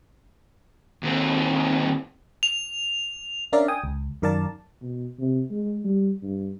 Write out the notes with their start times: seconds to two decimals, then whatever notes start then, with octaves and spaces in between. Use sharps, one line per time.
1.03 D#2 C4
2.43 F7
3.53 C#4 D4 A#4 D5 E5 F5
3.68 G5 G#5 D#6
3.84 C#2
4.22 F#2 D#3 A#4 D5 F5 A5
4.82 B2
5.19 C3
5.51 G#3
5.85 G3
6.23 G2